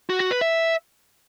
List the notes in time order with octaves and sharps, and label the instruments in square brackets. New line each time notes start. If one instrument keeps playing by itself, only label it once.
[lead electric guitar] F#4
F#4
B4
E5